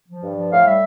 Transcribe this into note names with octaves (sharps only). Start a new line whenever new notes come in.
F3
G2
F3
A2 F5
G3 E5